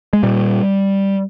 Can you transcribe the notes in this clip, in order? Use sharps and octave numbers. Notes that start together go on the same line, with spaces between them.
G#3
A#2 G3